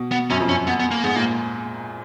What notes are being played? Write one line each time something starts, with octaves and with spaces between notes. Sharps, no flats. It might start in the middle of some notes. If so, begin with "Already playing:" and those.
Already playing: B2
B3
F#2 C#4
F2
F#2 C#4
B3
B3
A#3
G#2 B3
A#2 A#3